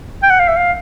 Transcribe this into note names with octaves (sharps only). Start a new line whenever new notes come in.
G5
F#5
F5
E5
F5